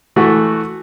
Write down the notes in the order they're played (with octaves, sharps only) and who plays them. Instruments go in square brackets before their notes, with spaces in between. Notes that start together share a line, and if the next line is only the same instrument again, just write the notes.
[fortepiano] E3 A3 F#4